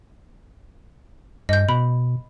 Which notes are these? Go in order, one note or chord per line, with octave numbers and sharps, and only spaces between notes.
G2 D#5 G6
B2 B5